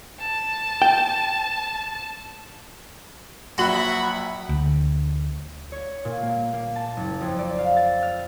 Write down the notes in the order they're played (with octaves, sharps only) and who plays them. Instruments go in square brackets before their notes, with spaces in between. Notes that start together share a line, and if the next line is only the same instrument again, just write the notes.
[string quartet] A5
[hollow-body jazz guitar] G5
[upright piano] A#1 F#3 F#7 [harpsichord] F#4 [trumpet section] E5 F#5 B5
[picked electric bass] D2
[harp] C#5
A#2
A#3
A#3
A5
F#1
F2
D5
F5
A6
F6